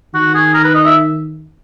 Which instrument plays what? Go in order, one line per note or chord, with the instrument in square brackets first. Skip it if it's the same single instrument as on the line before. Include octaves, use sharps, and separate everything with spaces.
[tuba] D#3 [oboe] F#4
[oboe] G#4
A#4
B4
D#5
E5